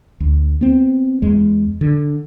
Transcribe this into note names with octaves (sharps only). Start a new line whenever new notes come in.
D2
B3 C4
E2 G#3
D3